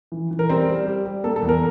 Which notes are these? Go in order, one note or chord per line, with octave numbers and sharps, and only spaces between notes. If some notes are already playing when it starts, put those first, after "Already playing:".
E3
E3
A#4
G3 C4 C5
G3
G3
G3
A#3 A4
A4
E2
A#4